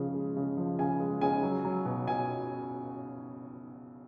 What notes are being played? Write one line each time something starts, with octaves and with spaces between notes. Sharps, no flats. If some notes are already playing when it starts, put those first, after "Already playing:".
Already playing: C#3 F3 G#3
G#3
C#3
F3
C#3 G#5
G#3
C#3 G#5
F#3
F#3
B2
B2 G#5